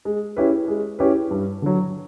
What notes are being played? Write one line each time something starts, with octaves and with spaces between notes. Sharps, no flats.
G#3
C#4 E4 G4 B4
G#3
C#4 E4 G4 B4
G2
D3 F#3